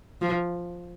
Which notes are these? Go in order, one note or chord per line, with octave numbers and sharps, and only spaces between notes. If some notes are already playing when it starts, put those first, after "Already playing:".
F3